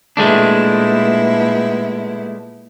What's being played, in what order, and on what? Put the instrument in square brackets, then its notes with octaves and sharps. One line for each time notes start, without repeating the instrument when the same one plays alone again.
[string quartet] A#2 B3 E4 [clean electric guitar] G#3 A3 D4